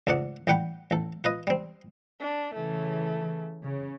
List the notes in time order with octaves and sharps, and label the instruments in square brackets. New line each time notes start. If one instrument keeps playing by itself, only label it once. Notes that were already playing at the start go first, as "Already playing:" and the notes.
[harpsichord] C#2 G#2 A3 D5 F#5
A1 G3 G4 F#5 G5 B5
A1 A4
F4 B4 D#5
G3 C4
[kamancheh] D4
[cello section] C#3 E3 [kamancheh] A3
[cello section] C#3